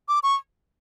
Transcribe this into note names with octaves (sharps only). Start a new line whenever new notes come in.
D6
C#6